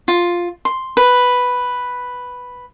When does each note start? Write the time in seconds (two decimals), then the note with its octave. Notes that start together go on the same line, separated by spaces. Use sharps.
0.08 F4
0.65 C6
0.97 B4